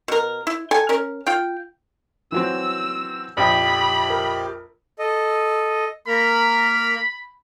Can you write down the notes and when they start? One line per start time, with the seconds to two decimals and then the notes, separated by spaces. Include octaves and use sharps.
0.08 B2 A#4
0.47 E4
0.71 A4 G5 G#5
0.89 C#4 A#4
1.27 F4 G5
2.32 E3 F#3 C4 E6
3.37 A#1 F2 G4 D5 G5 B5
4.10 A#4
4.99 A4 D#5
6.08 A#3 A#4 A#5 B5